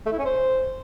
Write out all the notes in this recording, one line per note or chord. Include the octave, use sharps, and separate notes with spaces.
A3
E4
C#4
C5